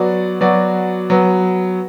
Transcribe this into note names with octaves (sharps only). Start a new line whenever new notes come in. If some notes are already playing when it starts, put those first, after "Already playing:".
Already playing: F#3 B3 F#4 D5
F#3 B3 F#4 D5
F#3 B3